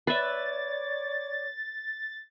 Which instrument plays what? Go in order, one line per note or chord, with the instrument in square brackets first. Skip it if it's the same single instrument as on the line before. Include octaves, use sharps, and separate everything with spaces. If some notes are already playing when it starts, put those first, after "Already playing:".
[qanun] B4 E5 [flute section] C#5 D5 [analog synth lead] A6